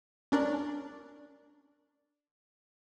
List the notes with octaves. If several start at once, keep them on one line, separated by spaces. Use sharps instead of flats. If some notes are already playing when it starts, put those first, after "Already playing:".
C#4 D4 A#4 D5